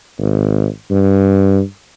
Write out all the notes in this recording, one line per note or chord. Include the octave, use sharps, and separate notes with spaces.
G#1
G2